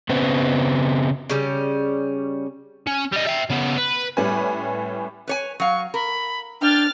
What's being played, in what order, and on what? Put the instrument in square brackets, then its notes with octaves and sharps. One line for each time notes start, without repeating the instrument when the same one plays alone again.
[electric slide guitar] C#3 B3 C4
[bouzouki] C#3 G3 C#4
[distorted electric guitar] C#4
G3 D#5
E5 G5
C#3 B3
B4
[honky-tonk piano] A2 G3 B3 C#4 B4 G#5
[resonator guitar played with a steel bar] B4 C#5 G#5
[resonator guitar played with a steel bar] F#3 F5 [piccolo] C#6
[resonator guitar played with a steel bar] A#4 [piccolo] B5
[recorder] D4 [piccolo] G5 [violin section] F6 A6